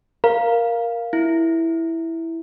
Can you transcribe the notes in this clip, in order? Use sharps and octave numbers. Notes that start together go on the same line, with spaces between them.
A#4 F5
E4